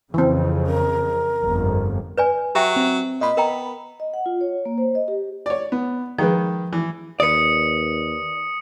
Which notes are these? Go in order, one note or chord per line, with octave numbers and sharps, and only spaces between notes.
F2 C#3 E3 C4
A#4
G1 F2
B4 D5 G#5
F#3 G4 E5 G5
C4
A#2 D#5 B5
B3 A#4 G5 A#5
D#5
F#5
F4
C#5
A#3
C5
D#5
G4
C#5 D5
B3
D#3 F3 G#3 B4
E3
D#2 B4 D5 D#6 C#7